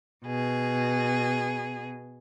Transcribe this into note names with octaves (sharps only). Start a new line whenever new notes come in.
B2 G#4